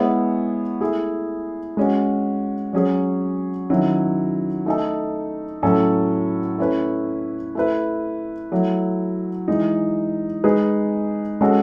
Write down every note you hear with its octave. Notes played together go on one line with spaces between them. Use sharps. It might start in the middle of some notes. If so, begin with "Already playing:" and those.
Already playing: G#3 B3 E4 G#4 C#5
A3 E4 G#4
G#3 C#4 F#4
F#3 C#4 G#4 C#5
D#3 F#3 C#4 E4
A3 D#4 A4
A2 F#3 C#4 E4 A4
A3 C#4 E4 B4
A3 E4 B4
F#3 A3 E4
E3 G#3 D#4
G#3 D#4 G#4 B4
G#3 C#4 F#4 A4